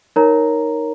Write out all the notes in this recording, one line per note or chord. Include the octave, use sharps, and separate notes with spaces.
D#4 A#4 C#5 A#5